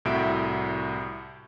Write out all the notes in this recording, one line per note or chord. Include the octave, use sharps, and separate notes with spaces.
C2 A2 F#4 E5 D7